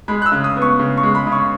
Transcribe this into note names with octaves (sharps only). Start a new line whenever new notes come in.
G#3 B5
F#6
E6
C#3
D#6
B3
C#6
C#3
C#6
G#3
B5
C#3
C#6